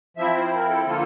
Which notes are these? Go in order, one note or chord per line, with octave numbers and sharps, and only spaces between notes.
F3 C4 E4 E5
C5
A#4
A4
D3 F3 A#3 F4 A4